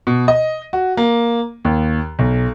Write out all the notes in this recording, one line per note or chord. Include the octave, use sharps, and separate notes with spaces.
B2
D#5
F#4
A#3
D#2
B1